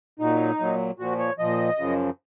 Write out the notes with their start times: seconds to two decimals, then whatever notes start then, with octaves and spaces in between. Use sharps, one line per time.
0.20 A#2 F#3 D#4
0.59 A#2 F#3
0.99 A#2 F3 F#4
1.19 C#5
1.39 A#2 F3 D#5
1.78 F#2 C#3 F3